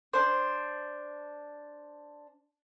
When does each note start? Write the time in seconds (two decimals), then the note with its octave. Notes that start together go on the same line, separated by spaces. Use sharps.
0.13 D4 C5